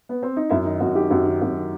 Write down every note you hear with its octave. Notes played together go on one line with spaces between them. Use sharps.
B3
C4
D#4
F#2 E4
D#3 D#4
F#2 F#4
D#3 G4
F#2 F#4
D#3
F#2 F#4
D#3